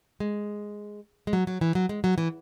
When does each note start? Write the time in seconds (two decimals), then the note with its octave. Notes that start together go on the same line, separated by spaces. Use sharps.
0.20 G#3
1.27 G#3
1.33 F#3
1.47 F#3
1.61 E3
1.75 F#3
1.89 G#3
2.04 F#3
2.18 E3